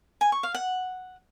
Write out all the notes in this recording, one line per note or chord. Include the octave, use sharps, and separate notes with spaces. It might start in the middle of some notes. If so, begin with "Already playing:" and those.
G#5
C#6
F5
F#5